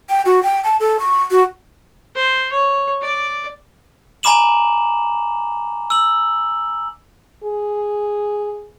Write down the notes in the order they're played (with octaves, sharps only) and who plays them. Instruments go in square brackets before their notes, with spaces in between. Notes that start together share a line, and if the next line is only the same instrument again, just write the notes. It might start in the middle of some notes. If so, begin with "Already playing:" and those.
[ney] G5
F#4
G5
A5
A4
C#6
F#4
[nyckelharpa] C5
C#5
D5
[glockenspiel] G#5 A#5 B5 D6 E7 F#7
E6 F#7
[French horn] G#4